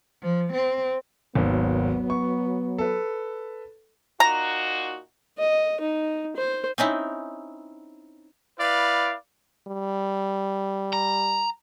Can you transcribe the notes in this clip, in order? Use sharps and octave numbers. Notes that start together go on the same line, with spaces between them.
F3
C4
G#1 D#2 F#3 B3
C#6
A4 B4
A#2 D#4 F#4 A#5
D#5
D#4
C5
C4 C#4 D#4 E4
E4 B4 D5 F5
G3
A#5